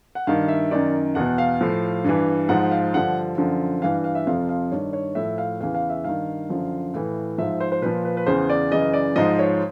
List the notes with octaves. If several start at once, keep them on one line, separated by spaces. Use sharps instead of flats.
F#5
G2 D#3 F5
E5
F#2 D#3 D5
E2 B2 F#5
F5
A2 F3
G2 E3
G#2 F3 F#5
F5
G2 D3 F3 F#5
F#2 D3 F3
G2 E3 F5
F5
E5
F2 C3 F3 F5
F5
G2 D#3 C#5
C#5
A2 F3 E5
F5
E2 C#3 E3 F5
F5
E5
G2 D#3 F5
F#2 D3 F3
A2 E3
G#2 F3 E5
C5
C5
A#2 F3 B4
B4
B4
E2 C#3 E3 C5
D5
F#2 C#3 E3 D#5
D5
G#2 F3 D#5
C#5